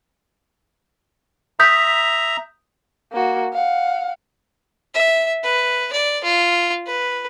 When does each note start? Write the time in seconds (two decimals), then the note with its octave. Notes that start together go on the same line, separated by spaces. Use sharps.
1.60 E5 A#5 D#6 G6 B6
3.13 A#3 F#4
3.53 F5 F#5
4.94 E5
5.43 B4
5.92 D5
6.24 F4
6.86 B4